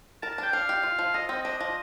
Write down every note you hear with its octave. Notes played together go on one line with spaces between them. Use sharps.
A#4 A5
A5
D4 G5
D4 F5
G4
F4
F3
A4 D#5
C4 D#5
D4 D#5
F3 D#5